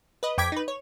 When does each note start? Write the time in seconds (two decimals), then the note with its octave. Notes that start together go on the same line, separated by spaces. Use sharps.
0.23 B4 D#5
0.38 F2 G5 D6 G#6 B6
0.52 D#4 B4
0.68 C#5